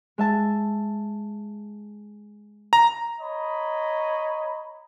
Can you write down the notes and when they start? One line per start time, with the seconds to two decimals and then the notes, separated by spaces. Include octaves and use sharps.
0.18 G#3 E5 A5
2.73 A#5
3.21 C#5 D#5 A#5 B5